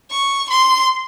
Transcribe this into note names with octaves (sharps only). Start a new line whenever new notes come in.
C#6
C6